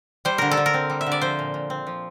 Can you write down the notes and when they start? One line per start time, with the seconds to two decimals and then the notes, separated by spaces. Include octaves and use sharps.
0.25 G3 C5
0.38 D3 A#4
0.51 A4
0.57 D3
0.66 A#4
0.74 C4
0.90 G3
1.01 E5
1.06 D3
1.12 D5
1.21 F3 C5
1.39 A#2
1.54 A#2
1.70 C4
1.87 F3